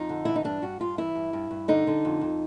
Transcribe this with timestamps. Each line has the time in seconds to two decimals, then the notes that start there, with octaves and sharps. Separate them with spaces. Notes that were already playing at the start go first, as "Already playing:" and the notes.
Already playing: F2 D#4
0.09 D3
0.25 E3 E4
0.36 D#4
0.44 G2 D4
0.62 G2 F#4
0.80 G2 F4
0.98 E3 E4
1.15 G2
1.33 G2
1.51 G2
1.68 D3 D#4
1.87 D3
2.05 F2
2.21 F2